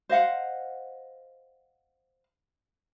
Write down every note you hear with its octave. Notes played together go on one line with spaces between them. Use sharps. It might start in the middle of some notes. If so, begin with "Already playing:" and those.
C5 D#5 F5 F#5